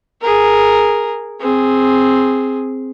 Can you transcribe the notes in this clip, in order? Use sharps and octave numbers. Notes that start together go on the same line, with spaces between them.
G#4 A#4
C4 G#4